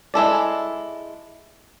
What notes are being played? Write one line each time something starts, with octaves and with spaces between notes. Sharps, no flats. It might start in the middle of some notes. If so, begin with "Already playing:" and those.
G#3 E4 A4 D5